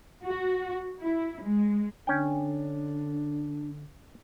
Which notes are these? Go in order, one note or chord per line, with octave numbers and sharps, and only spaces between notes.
F#4
E4
G#3
D3 C#4 D4 G5